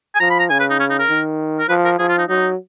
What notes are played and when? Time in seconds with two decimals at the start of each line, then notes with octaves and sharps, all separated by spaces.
0.15 G#5
0.20 F3 A#5
0.30 B5
0.39 A#5
0.50 C#3 G#5
0.60 B4
0.70 D#4
0.80 C#4
0.90 D#4
0.99 A#4
1.09 D#3
1.59 A#4
1.69 F3 B4
1.85 A#4
1.99 F3 G#4
2.09 F4
2.19 D#4
2.29 F#3 D#4